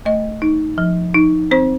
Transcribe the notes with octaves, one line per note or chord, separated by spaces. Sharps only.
A3 D#5
D#4
F3
D#4
C4 C5